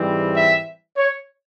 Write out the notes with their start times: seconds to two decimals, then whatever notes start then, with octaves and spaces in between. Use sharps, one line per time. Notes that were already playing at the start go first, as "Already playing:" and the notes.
Already playing: G#2 E3 G3 C4
0.34 E5
0.98 C#5